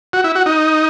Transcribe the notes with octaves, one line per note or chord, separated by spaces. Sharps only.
F#4
E4
F#4
D#4